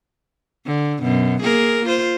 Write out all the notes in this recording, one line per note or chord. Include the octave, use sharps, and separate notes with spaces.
D3
F#2 B2
A#3 G#4 A#4
F4 C5